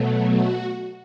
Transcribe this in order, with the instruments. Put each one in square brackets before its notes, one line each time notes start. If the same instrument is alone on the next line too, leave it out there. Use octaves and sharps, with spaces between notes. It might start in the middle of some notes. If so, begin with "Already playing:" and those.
Already playing: [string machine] B2 F#3 A3
F#4